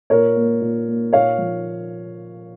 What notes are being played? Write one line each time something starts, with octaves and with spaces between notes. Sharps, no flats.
A#2 A#4 C#5
A#3
A#2
A#3
A#2 C#5 F5
F3